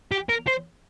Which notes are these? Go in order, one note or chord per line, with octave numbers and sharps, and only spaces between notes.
G4
A#4
C5